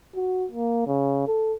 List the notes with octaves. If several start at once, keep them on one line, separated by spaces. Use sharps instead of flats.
F#4
A#3
C#3
A4